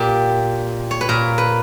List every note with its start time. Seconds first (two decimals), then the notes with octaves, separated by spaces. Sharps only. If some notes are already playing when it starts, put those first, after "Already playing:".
Already playing: A#2 G4
0.91 C#5
1.01 B4
1.09 A#2 A#4
1.38 B4